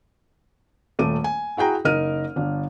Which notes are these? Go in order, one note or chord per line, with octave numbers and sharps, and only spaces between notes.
D#1 A3 D6 D#7
G#5
E4 F#4 G#4 G5 A#5
F#1 D#4 A#4 F6 D#7
G1 D4